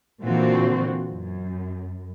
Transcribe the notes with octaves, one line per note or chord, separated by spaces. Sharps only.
A#2 D3 E3 C4 F4 F#4
F#2